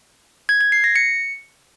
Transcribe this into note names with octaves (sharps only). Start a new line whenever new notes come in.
G#6
G#6
C7
A#6
C#7